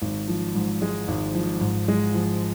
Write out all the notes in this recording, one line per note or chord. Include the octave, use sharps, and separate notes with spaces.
G#1
F3
G#2
G#3
G#1
F3
G#2
G#3
F3